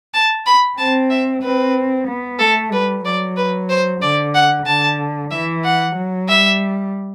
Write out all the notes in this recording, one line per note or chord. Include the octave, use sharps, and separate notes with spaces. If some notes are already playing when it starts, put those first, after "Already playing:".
A5
B5
C4 A5
E5
C4 B4
B3
A3 A4
G3 B4
F#3 D5
B4
C5
D3 D5
F#5
D3 A5
E3 E5
F#5
F#3
G3 E5